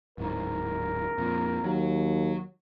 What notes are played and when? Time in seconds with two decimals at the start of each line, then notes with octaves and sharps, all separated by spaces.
0.18 D1 G#2 A#4
1.18 F2 A#2
1.64 D#2 F#3